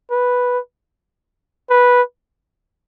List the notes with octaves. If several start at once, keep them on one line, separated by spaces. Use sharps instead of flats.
B4
B4